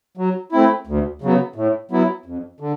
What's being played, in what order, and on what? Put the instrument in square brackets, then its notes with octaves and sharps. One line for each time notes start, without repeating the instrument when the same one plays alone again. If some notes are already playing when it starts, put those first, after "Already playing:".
[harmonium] F#3
A3 C4 E4
D2
C#3 F#3 B3
A2
F#3 B3 E4
F2
D3